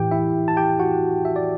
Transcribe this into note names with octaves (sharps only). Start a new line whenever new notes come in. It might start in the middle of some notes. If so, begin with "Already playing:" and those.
Already playing: A2 E3 G4 G5
E4 E5
A5
G4 G5
F#4 F#5
E5
D5